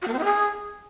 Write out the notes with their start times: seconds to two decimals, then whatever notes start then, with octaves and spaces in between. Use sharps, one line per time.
0.02 F#4
0.07 A#3
0.13 C4
0.18 E4
0.24 G#4